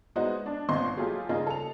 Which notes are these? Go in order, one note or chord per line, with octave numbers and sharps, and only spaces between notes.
G#3 B3 D#4 E4 F#4 C5
D4
G1 A#2 C4 D#5 C6 C#6
F#3 A3 F4 G4 G#4
C#3 G3 A#3 D#4 F4 G#4
A4 F7